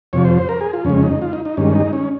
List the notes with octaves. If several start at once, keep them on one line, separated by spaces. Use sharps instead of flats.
F2 C3 F3 C#5
C5
C5
A#4
G#4
F4
F2 C#3 G#3 C#4
D#4
F4
D#4
D#4
G2 D#3 G#3 C#4
D#4
C#4